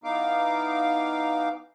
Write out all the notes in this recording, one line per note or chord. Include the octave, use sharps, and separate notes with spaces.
E3 B3 D#4 F5 D6